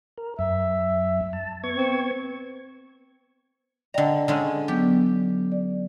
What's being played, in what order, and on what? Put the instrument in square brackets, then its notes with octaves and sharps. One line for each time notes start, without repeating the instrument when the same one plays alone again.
[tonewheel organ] A#4
[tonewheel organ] F#2 [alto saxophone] E5
[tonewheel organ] A5
B3 C#6 G#6
[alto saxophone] C4
[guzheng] D3 A#5 [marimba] D5 D#5 G5
[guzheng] D3 G#3 C#4
[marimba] F#3 B3 [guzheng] G4
[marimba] D5